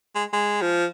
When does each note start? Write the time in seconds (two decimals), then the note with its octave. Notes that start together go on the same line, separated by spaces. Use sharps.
0.15 G#3
0.33 G#3
0.61 F3